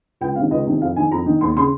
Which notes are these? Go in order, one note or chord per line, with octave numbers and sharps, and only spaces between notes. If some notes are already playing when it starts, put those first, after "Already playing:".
C#2 G5
C3 D#3 F5
C#2 D#5
C3 D#3
F2 F5
D#3 G#5
F2 A#5
D#3
D#2 C6
C#3 C6